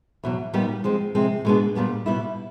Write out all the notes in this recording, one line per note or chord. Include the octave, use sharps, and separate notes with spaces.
E2 B2 F#3
A#2 G3 B3 D#4 G4
F3 G#3 C4
C3 F3 G#3 C4
B2 G#3 B3 D4
A#2 G3 B3 D4
B2 G3 B3 E4